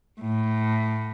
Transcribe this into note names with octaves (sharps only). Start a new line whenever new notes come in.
A2